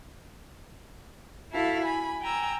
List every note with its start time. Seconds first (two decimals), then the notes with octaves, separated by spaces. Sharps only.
1.53 E4 F#4 A4 F5
1.84 G#5 B5
2.21 G5 G#5 A#5 E6